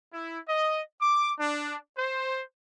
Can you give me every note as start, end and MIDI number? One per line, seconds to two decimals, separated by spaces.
0.12 0.38 64
0.47 0.81 75
1.01 1.31 86
1.39 1.77 62
1.97 2.41 72